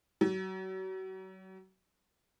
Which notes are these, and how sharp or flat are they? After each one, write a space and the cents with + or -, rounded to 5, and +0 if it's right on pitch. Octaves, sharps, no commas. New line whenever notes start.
F#3 +35